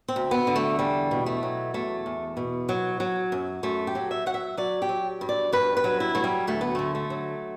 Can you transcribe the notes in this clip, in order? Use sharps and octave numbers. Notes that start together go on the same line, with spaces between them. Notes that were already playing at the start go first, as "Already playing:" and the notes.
C4
D2
B3
D3
A3
E2 G3
B2
A3
F#3
E2 A3
E2
B2
F#3
F#3
F#2
F#2 A3
G4
F#3
E5
F#3 F#5
E5
F#3 D5
G4
F#3
G2
D5
G2 B4
B4
F#3
E4
F#3 A3
G3
D2 A3
B3
D3 A3
A3
F#3